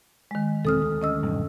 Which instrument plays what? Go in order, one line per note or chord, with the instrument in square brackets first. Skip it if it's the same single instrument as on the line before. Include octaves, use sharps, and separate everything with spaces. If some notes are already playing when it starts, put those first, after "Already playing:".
[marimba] D#3 G#3
[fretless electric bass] E1 C4 [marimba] A4 D#6 F6
[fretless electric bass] D2
[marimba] C#4 D#5 E6
[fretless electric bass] D#1 B1 G2